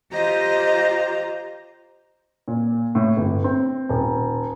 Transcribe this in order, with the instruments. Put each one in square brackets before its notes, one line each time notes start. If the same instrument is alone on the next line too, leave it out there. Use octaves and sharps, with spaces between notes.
[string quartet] F4 G4 C5 D#5 A#5
[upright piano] A#2
A2
G1
C4
D#1